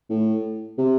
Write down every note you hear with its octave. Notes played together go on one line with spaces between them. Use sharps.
A2
C3